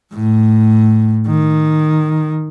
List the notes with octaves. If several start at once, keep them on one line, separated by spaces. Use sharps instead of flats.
A2
D#3